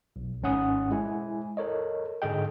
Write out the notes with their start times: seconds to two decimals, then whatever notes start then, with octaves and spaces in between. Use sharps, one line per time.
0.16 B1
0.42 G#1 G#2 C#4 F#5 D#6
0.91 G#3 E4 G#5
1.57 A4 A#4 C#5 D#5
2.22 G#2 D3 G#4 A4 D#5 G5